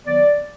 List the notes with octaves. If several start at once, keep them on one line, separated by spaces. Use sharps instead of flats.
D#3 F#3 B3 D5